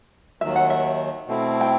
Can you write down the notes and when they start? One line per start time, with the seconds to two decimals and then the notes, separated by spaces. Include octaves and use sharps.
0.41 D#2 D#3 F#3 E5
0.56 F#5
0.70 E5
1.27 B2 A3 C4 E4
1.61 G5